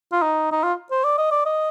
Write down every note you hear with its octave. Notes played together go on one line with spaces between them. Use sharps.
F4
D#4
D#4
F4
C5
D5
D#5
D5
D#5